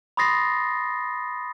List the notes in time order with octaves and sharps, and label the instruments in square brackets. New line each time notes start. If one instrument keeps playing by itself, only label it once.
[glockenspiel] B5 C6 D#6 A6 A#6 C7